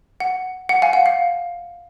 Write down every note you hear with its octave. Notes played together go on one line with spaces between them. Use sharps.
F#5
F#5
F5 G#5
F#5
F5